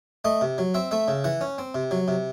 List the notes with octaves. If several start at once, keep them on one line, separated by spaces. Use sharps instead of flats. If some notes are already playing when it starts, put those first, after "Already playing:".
A3 D#5
C3
F#3
C4 E5
A3 E5
C#3
E3 F#5
C#4
C4
C3
F#3
C3